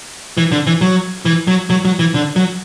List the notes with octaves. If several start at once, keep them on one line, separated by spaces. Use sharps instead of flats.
E3
D3
E3
F#3
E3
F#3
F#3
F#3
E3
D3
F#3